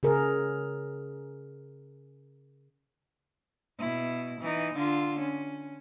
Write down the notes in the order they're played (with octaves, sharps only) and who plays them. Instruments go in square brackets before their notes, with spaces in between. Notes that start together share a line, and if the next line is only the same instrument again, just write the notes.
[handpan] C#3 G#4 A#4
[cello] B2 E4
E3 D#4
D3 F4
C#4